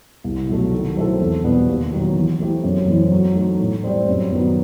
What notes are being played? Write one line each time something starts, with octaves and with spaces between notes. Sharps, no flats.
C2
B2 F#3 A3
D#3
F#3 C4 E4 A4
E2
B2 G3 B3
D#2
D#3 F#3
E3
A3 C4 E4 G4
F#2
E3 A3 C4 E4
F#3
A3 D#4
A2
G3 C4
F#2
D#3 F#3 B3